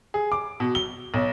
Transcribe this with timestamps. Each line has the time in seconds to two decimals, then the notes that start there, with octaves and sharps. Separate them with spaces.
0.14 G#4
0.32 D6
0.60 B2
0.75 G7
1.14 B1